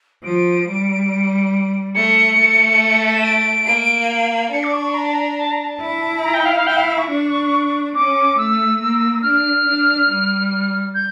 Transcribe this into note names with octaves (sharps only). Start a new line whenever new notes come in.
F3 D7
G3
A3 C#7
A3
E7
D7
A#3
D4 C#7
D6
C#6
C#6
A#5
A5
A#5
A5
A#5
A5
E4
A#5
G5
F5
F5
E4 G5
F5
E5
C#6
D4
C#4 D6
A3 E6
A#3
D4 F6
D4
G3
G6